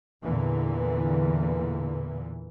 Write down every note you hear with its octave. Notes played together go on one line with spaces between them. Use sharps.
E2 A#2 D3 E3